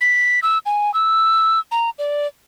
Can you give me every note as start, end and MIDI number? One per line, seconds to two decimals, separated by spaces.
0.01 0.40 95
0.43 0.58 88
0.66 0.93 80
0.94 1.59 88
1.71 1.90 82
1.99 2.27 74